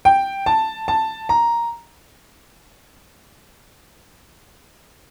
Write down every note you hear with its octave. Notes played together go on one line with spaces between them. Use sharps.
G5
A5
A5
A#5